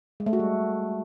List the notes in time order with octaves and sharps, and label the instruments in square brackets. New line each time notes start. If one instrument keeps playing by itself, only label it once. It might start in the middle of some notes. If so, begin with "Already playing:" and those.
[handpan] G#3
A3
F#4
G3